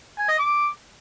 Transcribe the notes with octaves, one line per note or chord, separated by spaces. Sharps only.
G#5
D#5
D6